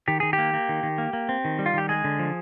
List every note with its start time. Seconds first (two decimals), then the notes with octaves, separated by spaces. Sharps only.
0.08 D#3 G4
0.20 D#3 G#4
0.33 G4
0.38 A#3
0.54 A#3
0.69 D#3
0.83 D#3
0.98 A#3
1.13 A#3
1.29 C4
1.45 D#3
1.59 G3
1.66 F4
1.74 D#3 G4
1.89 G#3 G#4
2.04 D3
2.19 F3